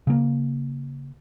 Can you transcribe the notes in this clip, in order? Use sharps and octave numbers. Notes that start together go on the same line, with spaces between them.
C#3 A#3